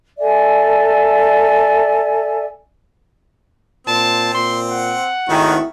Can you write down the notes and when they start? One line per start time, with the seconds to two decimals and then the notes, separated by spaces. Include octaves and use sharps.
0.18 A4 D5 E5 G#5
3.87 A#2 C4 A5
4.34 A#2 C6
4.71 F#5
5.29 G#1 D#3 A3 E4 F#4